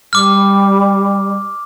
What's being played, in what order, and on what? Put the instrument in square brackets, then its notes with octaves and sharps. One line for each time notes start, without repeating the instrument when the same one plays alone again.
[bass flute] G3 [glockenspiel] D6 F6